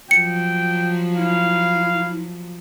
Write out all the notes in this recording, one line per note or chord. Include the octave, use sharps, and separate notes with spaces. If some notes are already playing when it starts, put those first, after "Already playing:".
F3 F#3 G5 C#7
E4 F5